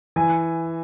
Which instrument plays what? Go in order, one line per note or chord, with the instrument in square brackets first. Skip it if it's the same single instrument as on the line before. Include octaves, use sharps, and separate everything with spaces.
[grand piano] E3 [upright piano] G#5